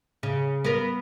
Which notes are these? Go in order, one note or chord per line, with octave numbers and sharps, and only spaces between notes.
C#3
B3 A#4